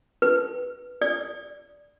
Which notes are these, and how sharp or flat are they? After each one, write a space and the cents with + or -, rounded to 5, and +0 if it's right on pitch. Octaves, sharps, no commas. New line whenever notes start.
B4 -5
D5 -5